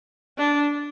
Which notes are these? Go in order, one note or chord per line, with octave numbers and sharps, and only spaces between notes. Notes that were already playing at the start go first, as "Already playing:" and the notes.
D4